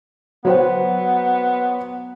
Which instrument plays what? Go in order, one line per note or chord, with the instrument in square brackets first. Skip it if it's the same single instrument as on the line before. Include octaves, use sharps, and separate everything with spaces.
[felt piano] F#3 C5 F#5 [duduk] B3